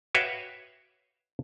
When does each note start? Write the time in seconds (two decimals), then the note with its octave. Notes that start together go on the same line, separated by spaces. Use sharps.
0.15 F#4 B4 C#5 E5 F5 G5